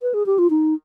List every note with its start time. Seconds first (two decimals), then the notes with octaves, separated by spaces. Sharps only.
0.02 B4
0.14 G#4
0.26 G4
0.38 F4
0.50 D#4